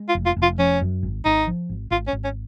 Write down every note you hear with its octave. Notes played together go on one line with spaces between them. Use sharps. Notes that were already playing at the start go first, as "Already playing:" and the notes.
Already playing: G#3
F4
F1
F4
F1
F4
F3 C#4
F#2
G#1
G#1 D#4
F3
G#1
G#1 F4
C#4
G#1
C#4